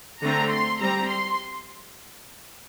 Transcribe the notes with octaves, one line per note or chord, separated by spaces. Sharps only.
D3 A3 C4 A#5
C6
G3 C4 A#5
C6